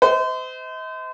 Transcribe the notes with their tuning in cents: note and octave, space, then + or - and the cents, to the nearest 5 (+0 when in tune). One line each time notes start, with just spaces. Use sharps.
C5 -35 D#5 +40